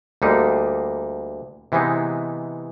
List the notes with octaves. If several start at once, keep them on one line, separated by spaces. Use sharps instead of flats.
D2 D3 G3 A#3 D#4
C3 E3 G#3 B3 D#4